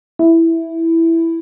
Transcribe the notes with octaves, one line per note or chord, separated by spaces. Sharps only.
E4